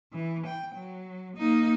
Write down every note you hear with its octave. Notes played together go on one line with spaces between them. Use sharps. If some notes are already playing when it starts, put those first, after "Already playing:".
E3
G5
F#3
A#3 D#4